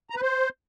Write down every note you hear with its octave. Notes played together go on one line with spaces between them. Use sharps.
A#5
B4
C5